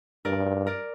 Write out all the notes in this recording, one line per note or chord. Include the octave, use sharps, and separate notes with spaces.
G2 A#4 D5
A#4 D5